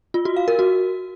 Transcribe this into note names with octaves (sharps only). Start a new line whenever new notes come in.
F4
F#4
F5
A#4
F#4